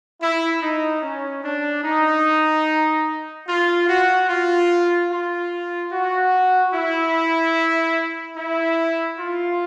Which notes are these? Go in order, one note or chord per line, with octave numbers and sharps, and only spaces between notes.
E4
D#4
C#4
D4
D#4
F4
F#4
F4
F4
F#4
E4
E4
F4